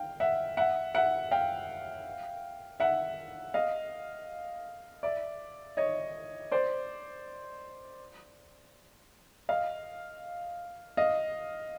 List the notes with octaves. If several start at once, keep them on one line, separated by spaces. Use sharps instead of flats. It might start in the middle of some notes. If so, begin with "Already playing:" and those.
Already playing: F5 G5
E5 F#5
E5 F#5
E5 F#5
F5 G5
E5 F#5
D#5 F5
D5 E5
C#5 D#5
C5 D5
D#5 F5
D#5 F5